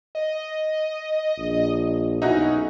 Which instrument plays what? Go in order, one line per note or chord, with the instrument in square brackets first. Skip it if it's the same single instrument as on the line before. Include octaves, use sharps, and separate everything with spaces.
[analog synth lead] D#5
[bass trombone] A#1
[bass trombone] B1 [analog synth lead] C#4 [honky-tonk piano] D#4 E4 F#4